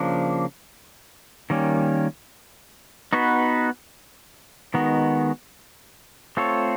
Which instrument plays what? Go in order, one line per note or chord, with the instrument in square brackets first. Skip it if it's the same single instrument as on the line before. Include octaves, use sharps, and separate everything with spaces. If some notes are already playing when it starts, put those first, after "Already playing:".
Already playing: [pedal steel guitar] C#3 F3 A#3 D4
D#3 G3 A#3 C#4
B3 D#4 F#4 B4
D#3 G#3 B3 D#4 F#4
A3 C4 F4 A4 C#5